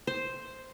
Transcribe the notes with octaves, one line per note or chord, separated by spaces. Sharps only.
C5